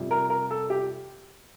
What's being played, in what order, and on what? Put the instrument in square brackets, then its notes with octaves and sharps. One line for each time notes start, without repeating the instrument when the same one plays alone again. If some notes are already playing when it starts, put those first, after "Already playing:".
Already playing: [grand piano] F2 C3 G3
A#4
A#4
A4
G4